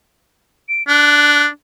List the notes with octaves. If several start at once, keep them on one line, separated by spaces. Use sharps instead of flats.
D7
D4 F#6